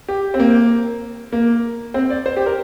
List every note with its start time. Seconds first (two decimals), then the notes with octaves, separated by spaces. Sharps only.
0.08 G4
0.34 C4
0.40 A#3
1.32 A#3
1.94 C4
2.10 D5
2.26 C5
2.37 G4
2.46 A#4